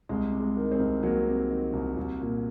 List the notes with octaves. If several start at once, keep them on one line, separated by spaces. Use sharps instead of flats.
C2 G#3
C3
G#3
D#3
G#3 C4
C2
C2 F#3 A#3
C3
D#3
C2
C2
A#2